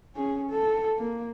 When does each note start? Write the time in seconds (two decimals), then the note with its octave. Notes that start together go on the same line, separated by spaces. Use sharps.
0.16 C#4 G#4
0.50 A4
0.98 A#3